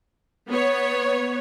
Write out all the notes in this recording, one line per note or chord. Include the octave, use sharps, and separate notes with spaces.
B3 C#5